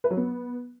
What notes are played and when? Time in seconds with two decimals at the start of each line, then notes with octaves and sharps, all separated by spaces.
0.04 B4
0.10 F#3
0.17 B3